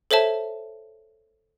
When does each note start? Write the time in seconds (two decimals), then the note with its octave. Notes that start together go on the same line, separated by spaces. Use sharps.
0.11 A4 C5 C#5 E5 A5